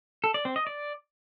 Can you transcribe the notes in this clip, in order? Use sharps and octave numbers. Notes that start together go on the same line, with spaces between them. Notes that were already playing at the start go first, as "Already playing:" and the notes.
A4
D5
C4
D#5
D5